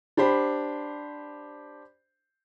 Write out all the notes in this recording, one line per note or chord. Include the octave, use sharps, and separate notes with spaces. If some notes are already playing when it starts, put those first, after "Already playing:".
D4 G4 C5 B5